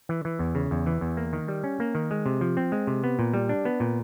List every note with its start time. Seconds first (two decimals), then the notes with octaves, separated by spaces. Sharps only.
0.09 E3
0.25 E3
0.39 E2
0.55 C#3
0.71 E2
0.86 E3
1.01 E2
1.17 A#3
1.33 D#3
1.48 G3
1.64 C#4
1.80 A#3
1.95 D#3
2.11 G#3
2.26 C3
2.41 F3
2.57 C4
2.72 G#3
2.87 C3
3.04 B3
3.19 A#2
3.34 G3
3.49 D4
3.65 B3
3.80 A#2